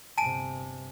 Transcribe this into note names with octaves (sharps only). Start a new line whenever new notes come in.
G1 C3 G#5 A5 D7